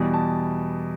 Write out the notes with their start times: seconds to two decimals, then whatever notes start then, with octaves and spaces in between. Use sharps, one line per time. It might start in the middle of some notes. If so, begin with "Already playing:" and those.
Already playing: E2 B2 G3
0.14 A5